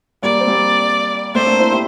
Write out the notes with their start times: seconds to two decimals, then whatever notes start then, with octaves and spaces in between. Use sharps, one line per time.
0.23 G3 A#3 D5
0.40 C4
0.48 G3 A#3
1.34 A3 C4 C5
1.47 A#3 D4
1.59 C4 E4
1.72 E4 G4